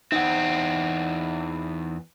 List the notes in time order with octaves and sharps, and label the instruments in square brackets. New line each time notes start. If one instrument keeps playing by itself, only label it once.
[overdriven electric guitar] E2 C4 [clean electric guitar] D#4 F#5